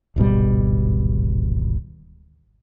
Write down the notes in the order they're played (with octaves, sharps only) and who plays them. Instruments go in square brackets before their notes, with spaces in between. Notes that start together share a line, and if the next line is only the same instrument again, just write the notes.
[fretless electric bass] D1 G#1 B2 G3